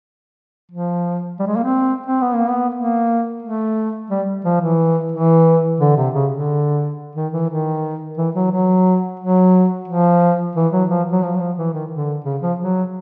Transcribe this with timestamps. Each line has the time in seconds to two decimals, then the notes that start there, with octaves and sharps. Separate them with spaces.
0.71 F3
1.39 G3
1.47 G#3
1.56 A#3
1.64 C4
2.06 C4
2.21 B3
2.35 A#3
2.49 B3
2.74 A#3
3.43 A3
4.10 G3
4.45 F3
4.61 E3
5.12 E3
5.80 D3
5.97 C3
6.14 C#3
6.31 D3
7.15 D#3
7.33 E3
7.50 D#3
8.17 E3
8.35 F#3
8.51 F#3
9.19 F#3
9.88 F3
10.56 E3
10.72 F#3
10.90 F3
11.11 F#3
11.23 F3
11.35 F#3
11.40 F3
11.58 E3
11.73 D#3
11.91 D3
12.24 C#3
12.42 F3
12.59 F#3